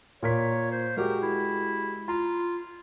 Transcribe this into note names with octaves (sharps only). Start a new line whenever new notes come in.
A#2 A#4 C#5 B6
C5
G#3 F#4 G4 A#4
E4
F4 A#5